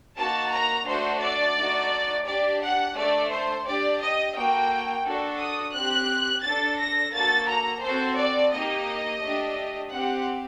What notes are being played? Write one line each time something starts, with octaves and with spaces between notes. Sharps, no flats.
A#3 D#4 F#4 A5
A#5
A3 D4 F#4 A4 C5
D5
A3 D#4 F#4
D4 G4 D5
F#5
A3 D4 A4 D5
C5
D4 G4 D5
D#5
A#3 F#4 A4 G5
D4 F#4 A4
D#6
C4 G4 F#6
D4 A4 A6
A#6
A#3 F#4 A4 A6
A#5
C4 F#4 A4 C5
D5
A#3 D#4 G4 D#5
A3 D4 G4
C4 G4 F#5